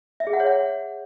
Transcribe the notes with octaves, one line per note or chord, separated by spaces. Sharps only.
E5
G#4
F#5
C#5
F#5